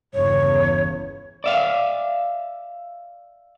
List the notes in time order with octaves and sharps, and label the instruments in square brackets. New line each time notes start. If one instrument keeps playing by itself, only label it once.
[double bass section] G1 E2 C#3 [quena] C#5
[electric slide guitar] D5 E5 F5